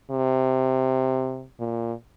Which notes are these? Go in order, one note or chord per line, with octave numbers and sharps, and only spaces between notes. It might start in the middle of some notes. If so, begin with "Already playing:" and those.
C3
A#2